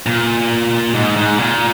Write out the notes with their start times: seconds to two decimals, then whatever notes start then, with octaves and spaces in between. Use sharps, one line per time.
0.06 A#2
0.95 G#2
1.17 G#2
1.38 A#2